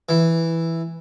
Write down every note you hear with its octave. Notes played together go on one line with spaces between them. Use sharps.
E3